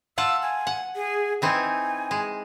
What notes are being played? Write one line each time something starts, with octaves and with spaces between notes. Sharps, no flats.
F4 F#5 A5 E6
G#5
F#5
G#4
E3 C4 D#4 G#5
G#3